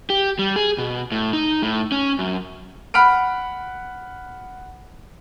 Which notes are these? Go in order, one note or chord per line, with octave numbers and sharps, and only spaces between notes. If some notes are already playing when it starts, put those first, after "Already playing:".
G4
G3
G#4
B2
A2
D#4
A2
C#4
F#2
F#5 B5 F6 D7